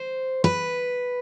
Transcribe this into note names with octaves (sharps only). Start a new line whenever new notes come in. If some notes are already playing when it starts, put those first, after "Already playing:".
Already playing: C5
B4